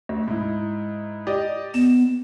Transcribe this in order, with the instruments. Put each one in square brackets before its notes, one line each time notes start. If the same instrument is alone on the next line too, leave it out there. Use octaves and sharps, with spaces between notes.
[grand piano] D2
G#2 E4
G4 D5 D#5
[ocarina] B3 [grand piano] E7